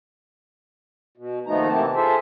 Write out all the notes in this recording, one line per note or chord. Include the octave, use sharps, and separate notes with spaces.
B2
D#2 F3 A3 B3 D#4 A#5
C3 E3 A#3 C4 A5
F4 G#4 A4 C5 E5